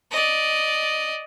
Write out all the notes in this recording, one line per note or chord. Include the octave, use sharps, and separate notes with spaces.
D5 D#5